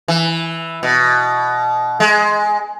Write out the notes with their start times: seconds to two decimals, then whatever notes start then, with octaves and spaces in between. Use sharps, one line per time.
0.08 E3
0.83 B2
2.00 G#3